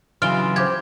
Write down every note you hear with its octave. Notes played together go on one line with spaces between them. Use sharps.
C#3 E3 F#3 F4 F6 D7 G7
G4 C5 D6 G#6